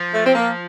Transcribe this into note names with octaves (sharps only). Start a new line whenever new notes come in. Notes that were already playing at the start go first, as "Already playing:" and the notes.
Already playing: F3
A3
C4
A#3